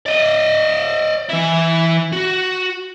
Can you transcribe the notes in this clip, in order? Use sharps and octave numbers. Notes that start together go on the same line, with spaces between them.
D5 D#5
E3 E4
F#4